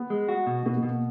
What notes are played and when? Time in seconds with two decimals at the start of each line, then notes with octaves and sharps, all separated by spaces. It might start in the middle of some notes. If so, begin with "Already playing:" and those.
Already playing: B3
0.10 G#3
0.29 F#4
0.47 B2
0.66 B2 B3
0.77 B3
0.83 B2
0.89 A#3